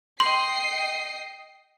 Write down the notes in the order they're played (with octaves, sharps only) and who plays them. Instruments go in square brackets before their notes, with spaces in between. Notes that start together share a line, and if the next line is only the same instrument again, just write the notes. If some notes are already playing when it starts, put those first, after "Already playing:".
[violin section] D#5 G5 C7 [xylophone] C6